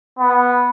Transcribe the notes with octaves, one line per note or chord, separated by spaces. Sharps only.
B3